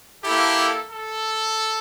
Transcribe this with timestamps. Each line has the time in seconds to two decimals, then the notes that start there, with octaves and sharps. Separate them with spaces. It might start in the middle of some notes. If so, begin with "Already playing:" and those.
0.23 A#3 E4 G4 A4
0.90 A4